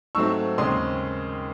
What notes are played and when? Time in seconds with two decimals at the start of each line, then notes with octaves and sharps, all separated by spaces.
0.15 G#2 F#3 A3 C4 C#6 E6
0.58 D#2 C#3 G#3 C4 C6 D#6